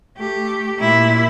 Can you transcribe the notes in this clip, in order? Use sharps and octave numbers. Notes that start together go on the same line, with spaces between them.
A3 G4
A#2 E4